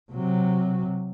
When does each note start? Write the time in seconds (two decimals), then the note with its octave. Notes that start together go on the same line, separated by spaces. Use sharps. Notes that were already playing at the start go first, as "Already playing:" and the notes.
0.12 C3 F#3